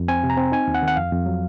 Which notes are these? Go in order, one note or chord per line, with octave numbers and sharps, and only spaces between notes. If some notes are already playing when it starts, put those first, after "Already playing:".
Already playing: F2
C4 G#5
C3
A#5
C4
D#4 G#5
D#2
F#5
D#3
F#5
F2 F5
F2
F#3